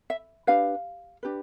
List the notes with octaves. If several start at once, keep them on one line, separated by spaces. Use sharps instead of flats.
E5
D4 G4 B4 F5
D4 G4 B4